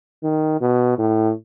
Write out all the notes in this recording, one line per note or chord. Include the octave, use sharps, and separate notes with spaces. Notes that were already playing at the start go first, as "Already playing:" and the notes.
D#3
B2
A2